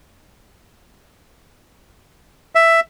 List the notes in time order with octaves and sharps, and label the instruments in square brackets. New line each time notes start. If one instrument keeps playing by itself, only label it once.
[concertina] E5